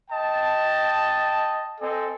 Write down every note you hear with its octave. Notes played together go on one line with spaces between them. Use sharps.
D#5 G5 A5
C4 A4 D#5 G#5